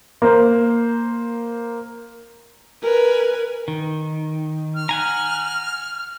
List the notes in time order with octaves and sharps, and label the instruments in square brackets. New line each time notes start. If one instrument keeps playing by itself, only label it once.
[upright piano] A#3 C5
[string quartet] A#4 B4 G#5
[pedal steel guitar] D#3
[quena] F6
[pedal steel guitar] F#5 G#5 A#5